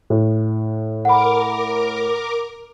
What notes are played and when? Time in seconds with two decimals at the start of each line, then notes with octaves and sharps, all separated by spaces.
0.10 A2
1.05 A#4 F#5 B5 D6